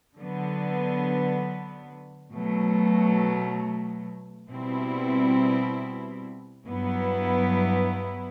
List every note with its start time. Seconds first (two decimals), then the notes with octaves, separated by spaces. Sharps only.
0.18 D3 F#3 B3
2.33 B2 F#3 A3
4.49 B2 G3 C4 E4
6.64 G2 F#3 B3 E4